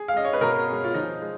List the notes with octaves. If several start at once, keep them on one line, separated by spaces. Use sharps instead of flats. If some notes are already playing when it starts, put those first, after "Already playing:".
Already playing: G#4
F5
G#3 C#4 D#5
C#5
B4
B2 A#4
G#3 C#4
F4
F3 D#4
G#3